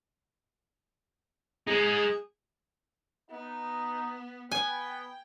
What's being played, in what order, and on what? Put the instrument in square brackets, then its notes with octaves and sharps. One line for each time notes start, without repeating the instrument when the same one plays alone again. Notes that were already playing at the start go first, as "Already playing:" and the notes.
[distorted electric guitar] G#3 D#4 [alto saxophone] G#4
[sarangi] B3 [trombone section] D#4
[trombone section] B3 [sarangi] G5 [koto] G#5